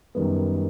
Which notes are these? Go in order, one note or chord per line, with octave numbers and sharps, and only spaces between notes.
F#2 D#3 G3 B3